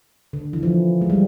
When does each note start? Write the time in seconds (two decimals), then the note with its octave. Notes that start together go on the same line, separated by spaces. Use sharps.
0.33 D3
0.53 E3
0.63 F3
1.01 G#3
1.10 G3